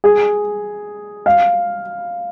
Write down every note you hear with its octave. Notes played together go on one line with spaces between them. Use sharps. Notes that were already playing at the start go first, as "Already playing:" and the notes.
G#4
F5